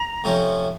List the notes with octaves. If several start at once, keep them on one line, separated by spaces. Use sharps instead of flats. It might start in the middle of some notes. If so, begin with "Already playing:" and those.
Already playing: A#5
F2 C3 F3 A3 C#4